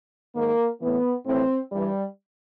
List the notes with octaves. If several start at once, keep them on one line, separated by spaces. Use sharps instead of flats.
G#2 D#3 A#3
A2 E3 B3
A2 E3 C4
G2 E3 G3